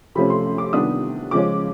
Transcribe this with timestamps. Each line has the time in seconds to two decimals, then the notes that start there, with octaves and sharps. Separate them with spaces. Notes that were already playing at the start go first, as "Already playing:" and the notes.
0.15 C3 F3 A3 C#4 B5
0.30 C6
0.58 D6
0.73 C3 D#3 G3 B3 D4 D#6
1.31 C#3 F3 G#3 C#4 D6